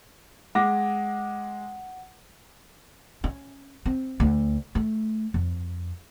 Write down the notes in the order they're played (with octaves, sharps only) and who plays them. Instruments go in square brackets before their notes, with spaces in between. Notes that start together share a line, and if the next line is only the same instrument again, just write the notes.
[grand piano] G#3 D6 A#6 [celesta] F#5
[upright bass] C#4
C4
D2
A3
F2